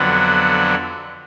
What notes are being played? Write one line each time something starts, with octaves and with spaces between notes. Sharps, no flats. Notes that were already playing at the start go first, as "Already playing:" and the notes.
Already playing: F2 D3 F#3 B3 D4